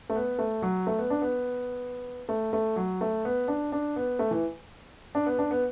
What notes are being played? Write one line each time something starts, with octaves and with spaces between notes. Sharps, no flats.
A3
B3
A3
F#3
A3
B3
D4
B3
A3
A3
F#3
A3
B3
D4
D4
B3
A3
E3
D4
B3
D4
B3